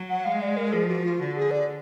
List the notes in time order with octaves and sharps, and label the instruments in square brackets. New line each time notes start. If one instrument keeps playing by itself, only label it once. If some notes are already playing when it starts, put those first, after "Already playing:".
Already playing: [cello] F#3
[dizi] F#5
[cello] G#3 [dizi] F5
[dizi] D5
A#4
[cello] F3 [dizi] G#4
[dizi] F#4
F4
[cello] D3 [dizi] F#4
[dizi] G#4
D5